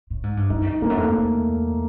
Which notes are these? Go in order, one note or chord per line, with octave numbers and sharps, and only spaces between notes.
A2
G#2
G2
F#2 D#4
D#4
F2 A#3
F#2
F2 A3
E2